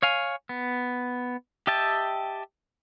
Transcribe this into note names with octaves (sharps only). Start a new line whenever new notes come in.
C#5 F5 G#5
B3
G4 D#5 E5 G5 A5